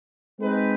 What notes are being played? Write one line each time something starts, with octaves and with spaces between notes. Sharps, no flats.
G#3 C4 D#4 G#4 B4